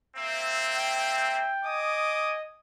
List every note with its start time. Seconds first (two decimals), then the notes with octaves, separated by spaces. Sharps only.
0.16 A#3 C4 E5
0.75 G5
1.64 D#5 G#5 D6 D#6